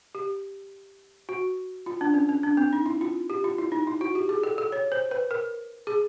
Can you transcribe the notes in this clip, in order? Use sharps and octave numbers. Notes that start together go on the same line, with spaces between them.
G4
F#4
F4
D4
C#4
C#4
D4
C4
D#4
E4
F4
G4
F4
E4
D#4
E4
F#4
G4
G#4
A4
A4
C#5
C5
B4
A#4
G#4